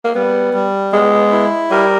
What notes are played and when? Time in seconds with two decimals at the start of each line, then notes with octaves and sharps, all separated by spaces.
0.04 A#3
0.15 G3 B3
0.54 G3
0.92 G#3 B3
1.32 E4
1.71 G3 A#4